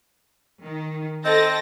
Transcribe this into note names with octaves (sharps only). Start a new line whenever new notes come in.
D#3
C4 A4 D#5 A6 A#6